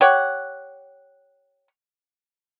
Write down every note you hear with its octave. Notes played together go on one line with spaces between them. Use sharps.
G4 C#5 F#5